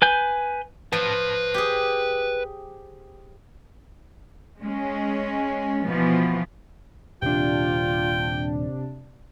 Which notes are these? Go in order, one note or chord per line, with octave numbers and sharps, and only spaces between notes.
B4 G#5 G6
F3 B4 A5
G4 G#4
G#3 C#4
B2 E3 F3 B3
D#1 C3 D4 F4 G5